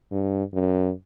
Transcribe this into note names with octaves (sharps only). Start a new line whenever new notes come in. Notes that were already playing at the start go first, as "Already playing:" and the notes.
G2
F#2